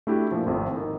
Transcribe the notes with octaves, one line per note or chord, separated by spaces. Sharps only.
A3 D4 E4 F#4 G4
A#2 F3
G#1 F2 A2
D#3